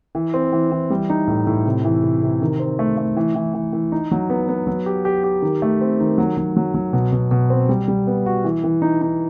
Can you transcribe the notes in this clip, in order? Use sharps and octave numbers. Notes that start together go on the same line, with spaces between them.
E3
C4
E3
E3
G3
D#4
A2
A2
C3
E3
C3
C3
D#3
C4
A3
A3
E3
E3
E3
E3
D#4
F#3
B3
B3
F#3
G4
G4
G4
D#3
A3
C4
D#3
F#3
F#3
F#3
F#3
B2
B2
B2
C4
G3
G3
B3
F#4
E3
E3
D#4
D#4